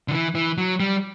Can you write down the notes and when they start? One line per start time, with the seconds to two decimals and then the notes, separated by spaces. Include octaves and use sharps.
0.08 D3
0.11 E3
0.35 E3
0.58 F#3
0.80 G3